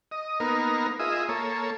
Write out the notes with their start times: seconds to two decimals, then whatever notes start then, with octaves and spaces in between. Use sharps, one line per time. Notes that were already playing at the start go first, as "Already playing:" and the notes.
0.11 D#5
0.40 A#3 B3 D#4 A#4
0.99 F4 G#4 D#5 E5
1.29 A#3 A4 C#5